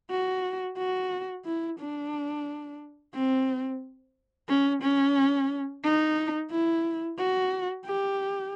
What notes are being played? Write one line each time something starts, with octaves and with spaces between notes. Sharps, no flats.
F#4
F#4
E4
D4
C4
C#4
C#4
D#4
E4
F#4
G4